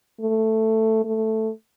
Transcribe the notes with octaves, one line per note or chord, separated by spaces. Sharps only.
A3
A3